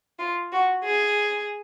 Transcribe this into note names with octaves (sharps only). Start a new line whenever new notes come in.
F4
F#4
G#4